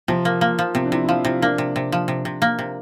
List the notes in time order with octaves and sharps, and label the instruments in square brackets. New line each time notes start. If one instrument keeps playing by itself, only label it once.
[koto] C3 [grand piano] F3
[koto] A#3
A#3
F3
[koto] C3 [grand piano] C4
[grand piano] D4
[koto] C3 [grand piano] E4
[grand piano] E4
[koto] F3 [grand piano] F4
[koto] C3 [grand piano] E4
[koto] A#3 [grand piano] D4
[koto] C3
C3
F3
C3
C3
A#3
C3